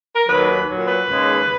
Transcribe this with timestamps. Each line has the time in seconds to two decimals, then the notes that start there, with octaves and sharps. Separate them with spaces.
0.15 A#4
0.28 D#2 D#3 F#3 B4
0.68 A#2 F#3
0.87 B4
1.07 D#2 C#3 G#3